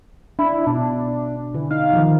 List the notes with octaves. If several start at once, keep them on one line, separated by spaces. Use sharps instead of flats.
D4 E4
B2 D4
D3 E3
D#4 F5
D#3 F3